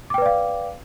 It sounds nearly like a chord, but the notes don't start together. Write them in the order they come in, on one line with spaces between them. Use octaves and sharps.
D6 G5 B4 D5 F5